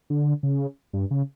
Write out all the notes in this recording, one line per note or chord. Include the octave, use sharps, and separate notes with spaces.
D3
C#3
G2
C#3